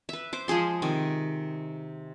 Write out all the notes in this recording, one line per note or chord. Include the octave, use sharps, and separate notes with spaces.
B4 E5
C5 D6
F3 G#3 G#4 C6
C3 D#3